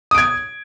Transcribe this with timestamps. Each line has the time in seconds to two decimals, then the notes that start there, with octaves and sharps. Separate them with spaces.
0.11 D#6
0.14 D7
0.18 G#6